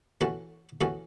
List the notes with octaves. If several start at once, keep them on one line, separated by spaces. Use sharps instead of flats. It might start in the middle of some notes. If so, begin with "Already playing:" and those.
E3 A3 C#4 F#4
E3 A3 C#4 F#4